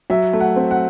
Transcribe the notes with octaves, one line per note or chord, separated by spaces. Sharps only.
F#3 E5
A3
F#5
C4
F#5